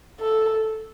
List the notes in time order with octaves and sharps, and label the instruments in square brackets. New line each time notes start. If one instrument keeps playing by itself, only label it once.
[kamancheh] A4